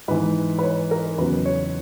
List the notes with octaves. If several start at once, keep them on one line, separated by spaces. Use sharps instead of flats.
G#2 E3 B4
B4
C#5
A#4
E2 C#3 F#3 B4
C#5